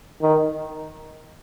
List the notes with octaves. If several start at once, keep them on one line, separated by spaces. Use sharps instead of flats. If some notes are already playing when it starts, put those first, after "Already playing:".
D#3